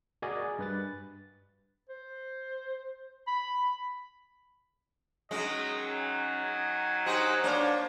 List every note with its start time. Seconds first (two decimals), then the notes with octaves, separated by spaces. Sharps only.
0.22 F#4 G#4 A#4 D5 D#5 G#5
0.59 G2 B4 A6
1.89 C5
3.27 B5
5.31 D#3 F#3 G#3 C#4 D#5
5.87 G#5
7.06 D#4 F#4 G4 C5 F#6
7.44 A#3 D4 C5 C#5